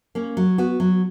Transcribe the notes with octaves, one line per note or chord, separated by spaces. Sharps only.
A#3 C#4
F#3
B3 F#4
F#3